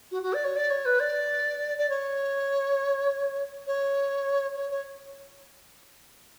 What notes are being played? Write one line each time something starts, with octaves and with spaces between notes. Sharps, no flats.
F#4
F#4
D5
C#5
D5
C#5
B4
D5
D5
C#5
C#5
C#5
C#5